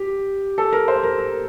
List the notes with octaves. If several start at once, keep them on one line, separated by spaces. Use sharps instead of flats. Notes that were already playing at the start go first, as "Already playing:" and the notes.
Already playing: G4
A4
A#4
C5
A#4
A#4